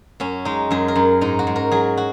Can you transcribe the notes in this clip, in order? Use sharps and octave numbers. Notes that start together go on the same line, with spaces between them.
F#2 C#4
G#3 D#4
F#2 G#4
A#4
F#2
G#2 D#4
F#4
G#2
A#4
F#3 G#4
F#4